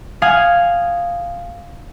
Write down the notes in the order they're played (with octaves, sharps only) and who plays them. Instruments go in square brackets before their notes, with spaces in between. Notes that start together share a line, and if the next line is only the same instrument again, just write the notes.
[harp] F5 F#5 G#5 D#6